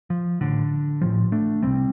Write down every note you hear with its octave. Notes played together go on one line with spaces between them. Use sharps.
F3
A1 A2 D3
A1 A2 F3
A3 D4
C2 C3 G3 C4